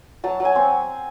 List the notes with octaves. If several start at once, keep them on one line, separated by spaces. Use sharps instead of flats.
F#3 A5
F#3
G#5
C4